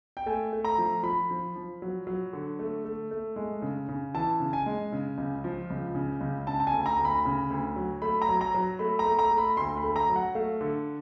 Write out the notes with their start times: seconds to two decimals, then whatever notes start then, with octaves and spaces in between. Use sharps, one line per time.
0.17 G5
0.26 A3 G#5
0.53 A3
0.65 A#5
0.78 F3
1.03 F3 B5
1.30 F3
1.56 F3
1.82 F#3
2.07 F#3
2.33 D3
2.59 A3
2.85 A3
3.11 A3
3.36 G#3
3.62 C#3
3.89 C#3
4.15 E3 A5
4.40 C#3
4.53 G#5
4.66 G#3
4.92 C#3
5.18 C#2
5.44 F3
5.70 C#2
5.95 C#3
6.21 C#2
6.47 C#3 A5
6.60 A5
6.67 G#5
6.73 D2
6.86 A#5
6.99 D2
7.05 B5
7.25 C#3
7.50 D2
7.76 F#3
8.02 A3 B5
8.22 A#5
8.29 F#3
8.41 A#5
8.54 F#3
8.79 A3 B5
8.99 A#5
9.06 A3
9.19 A#5
9.31 A3
9.38 B5
9.57 D2 C6
9.77 B5
9.84 A3
9.96 A#5
10.09 F#3
10.16 F#5
10.35 A3 F5
10.61 D3